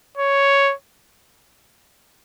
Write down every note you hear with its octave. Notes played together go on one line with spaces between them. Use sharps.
C#5